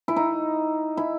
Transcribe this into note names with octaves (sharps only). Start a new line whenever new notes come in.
E4
D#4
E4